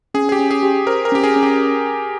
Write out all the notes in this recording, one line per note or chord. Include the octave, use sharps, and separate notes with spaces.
C#4 G#4
G#4
G4
C#4
G#4
G4
A#4 C5
A#4
C#4 G4
G#4
C#4
G4